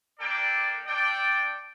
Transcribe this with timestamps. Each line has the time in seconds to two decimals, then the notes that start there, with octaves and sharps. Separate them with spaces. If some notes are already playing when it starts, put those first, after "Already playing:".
0.18 A#3 D4 A4 D5 G5
0.86 D4 A4 D5 G5